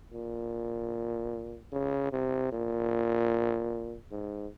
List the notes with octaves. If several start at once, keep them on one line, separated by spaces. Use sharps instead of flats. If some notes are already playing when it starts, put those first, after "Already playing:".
A#2
C#3
C3
A#2
G#2